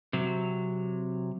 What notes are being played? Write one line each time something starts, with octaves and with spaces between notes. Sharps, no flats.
C3 F#3